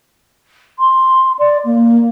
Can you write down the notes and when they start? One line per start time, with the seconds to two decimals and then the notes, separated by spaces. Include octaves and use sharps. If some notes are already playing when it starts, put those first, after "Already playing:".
0.79 C6
1.38 D5
1.64 A#3